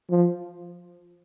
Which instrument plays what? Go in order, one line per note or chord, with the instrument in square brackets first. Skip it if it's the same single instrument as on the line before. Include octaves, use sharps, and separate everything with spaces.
[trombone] F3